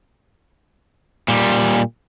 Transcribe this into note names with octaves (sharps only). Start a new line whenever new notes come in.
A#2 G3